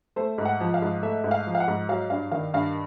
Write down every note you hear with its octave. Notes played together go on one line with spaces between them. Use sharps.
A3 C5
G#2
F#5
F3
F5
G#2
A3 E5
G#2
F5
F3
F5
F#5
G#2
F#3 F5
G2 F5
D#3 F5
G2 F5